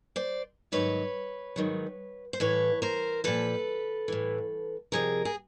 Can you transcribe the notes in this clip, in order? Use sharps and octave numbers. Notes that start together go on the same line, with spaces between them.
C5 D5
G#2 D#3 F#3 B4 C#5
G#2 D#3 F#3
C5
A2 E3 B4 C#5
A#4 C5
A#2 F3 A4 B4
A2 E3
F2 C3 F3 G#4 A#4
G#4